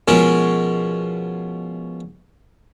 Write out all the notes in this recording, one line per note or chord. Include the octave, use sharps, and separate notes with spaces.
B2 F3 G#3 C#4 A#4